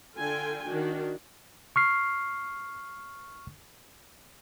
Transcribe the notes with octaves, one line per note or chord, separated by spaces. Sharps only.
D3 F4 A4 G5 G#5
D#3 D4 F#4
C#6 F6 C7